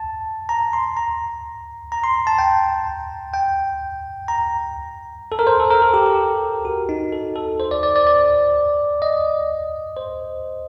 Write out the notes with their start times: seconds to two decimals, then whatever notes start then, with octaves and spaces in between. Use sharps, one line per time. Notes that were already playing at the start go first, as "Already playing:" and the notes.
Already playing: A5
0.49 A#5
0.73 C6
0.97 A#5
1.92 A#5
2.04 C6
2.27 A5
2.38 G5
3.34 G5
4.28 A#5
5.32 A4
5.39 A#4
5.47 C5
5.60 A4
5.70 A#4
5.82 A4
5.94 G4
6.06 G4
6.65 F#4
6.89 D#4
7.13 A4
7.36 A4
7.60 C5
7.71 D5
7.83 D5
7.96 D5
8.07 D5
9.02 D#5
9.97 C5